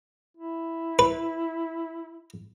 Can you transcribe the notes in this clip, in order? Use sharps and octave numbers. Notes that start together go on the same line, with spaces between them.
E4
B4